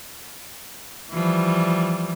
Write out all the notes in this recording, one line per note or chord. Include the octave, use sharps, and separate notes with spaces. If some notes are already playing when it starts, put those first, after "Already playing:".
E3 F3 G3